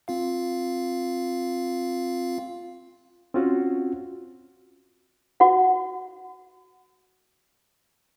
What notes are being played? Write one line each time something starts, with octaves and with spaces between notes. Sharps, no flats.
C4 F4 F5
C4 C#4 F4 F#4
F#4 F#5